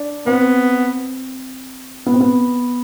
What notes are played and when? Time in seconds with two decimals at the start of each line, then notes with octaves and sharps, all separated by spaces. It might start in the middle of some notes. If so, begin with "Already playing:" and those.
Already playing: D4
0.27 B3 C4
2.06 B3
2.14 C4
2.21 B3